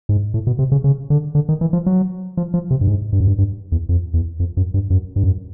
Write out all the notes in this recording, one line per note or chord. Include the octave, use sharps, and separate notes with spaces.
G#2
A2
B2
C3
C#3
C#3
D3
D3
D#3
E3
F3
F#3
F3
F3
C3
G2
G#2
G2
F#2
G2
G2
E2
F2
E2
F2
F#2
G2
F#2
G2
F#2